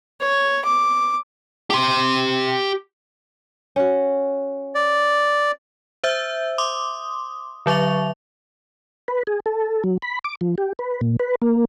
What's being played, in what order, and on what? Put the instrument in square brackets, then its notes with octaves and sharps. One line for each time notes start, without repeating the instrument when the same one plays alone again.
[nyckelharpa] C#5
D6
[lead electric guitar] G4 C6
[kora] C#4 F#4
[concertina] D5
[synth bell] C5 E5 E6 G6
C6 D6 D#6
D3 F#3 E5 C#6 F7
[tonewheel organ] B4
G#4
A4
F#3
B5
D6
F3
G4
B4
A#2
B4
A#3